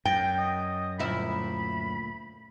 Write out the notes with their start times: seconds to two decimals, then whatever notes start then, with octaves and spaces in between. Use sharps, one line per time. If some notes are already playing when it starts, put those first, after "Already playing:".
0.05 F#2 G5
0.39 D#5
0.99 D2 A#2 E4 B5